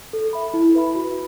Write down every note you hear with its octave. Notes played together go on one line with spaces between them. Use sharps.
A4
E5 B5
E4
B4 E5 B5
F#4